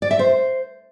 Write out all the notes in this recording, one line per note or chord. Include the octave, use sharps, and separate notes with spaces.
D5
E5
C5